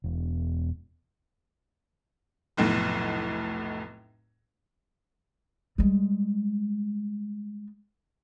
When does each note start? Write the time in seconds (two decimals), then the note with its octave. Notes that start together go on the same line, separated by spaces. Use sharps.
0.04 E1
2.57 F1 B1 A2
5.78 G3 G#3